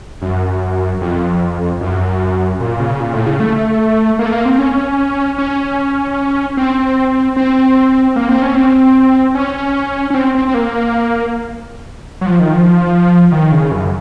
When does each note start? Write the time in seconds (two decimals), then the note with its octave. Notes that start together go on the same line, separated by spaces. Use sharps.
0.22 F#2
1.01 F2
1.81 F#2
2.60 A#2
2.80 C#3
3.00 A#2
3.13 A2
3.26 C#3
3.40 A3
4.19 A#3
4.26 A3
4.32 A#3
4.45 C4
4.58 C#4
5.38 C#4
6.57 C4
7.36 C4
8.16 A#3
8.29 C4
8.42 C#4
8.55 C4
9.35 C#4
10.10 C#4
10.14 C4
10.35 C4
10.48 C4
10.54 A#3
12.21 F#3
12.26 F3
12.39 D#3
12.53 F3
13.32 D#3
13.52 C#3
13.72 F#2